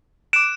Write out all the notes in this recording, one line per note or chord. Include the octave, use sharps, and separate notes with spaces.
D6 F#6 D7 E7